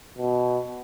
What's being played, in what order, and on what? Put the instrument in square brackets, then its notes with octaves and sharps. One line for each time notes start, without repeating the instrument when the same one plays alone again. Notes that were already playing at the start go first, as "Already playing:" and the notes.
[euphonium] B2